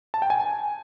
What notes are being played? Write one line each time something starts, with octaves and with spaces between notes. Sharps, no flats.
A5
G5
G#5